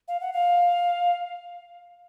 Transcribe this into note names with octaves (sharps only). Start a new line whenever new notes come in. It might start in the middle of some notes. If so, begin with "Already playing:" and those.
F5
F#5
F5